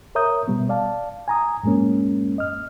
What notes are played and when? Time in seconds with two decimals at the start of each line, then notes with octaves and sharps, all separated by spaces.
0.15 A#4 C#5 E5 A#5 D#6 G6
0.48 B2 G3 B3
0.69 D5 F5 A5
1.28 G#5 A#5 D#6
1.63 F#2 A2 G#3 A#3 C#4
2.38 D#5 F6